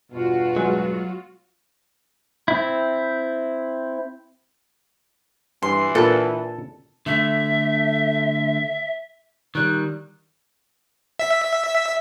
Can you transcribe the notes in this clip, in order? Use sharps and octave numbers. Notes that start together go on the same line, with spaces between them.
E2 G2 B2 F4 F#4
F#3 G#3
C4 E4
G2 E3 C6
A#2 D4 A4 B4
D3 A3 E5
D#3 G3 F#6
E5 B6